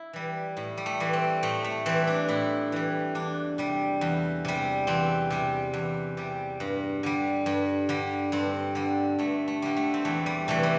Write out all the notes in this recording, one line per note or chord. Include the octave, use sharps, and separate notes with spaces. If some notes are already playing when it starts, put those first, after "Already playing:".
Already playing: E4
E3 G3
A2
G3
A3
E3 G3
C4
A2 A3
A3
E3 G3 C4
D4
A2 E4
E3 G3
E2 D4
C3 G3
E2
C3 G3
E2 C4
C3 G3
E2
C3 G3
G2
D3 G3
G2
D3 G3
G2 C4
D3 G3
G2 A3
A3
D3 G3
A3
C4
E2 A3
G3
C3 E3 A3
G3